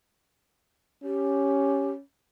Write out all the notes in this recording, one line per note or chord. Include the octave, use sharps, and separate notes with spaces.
C#4 G4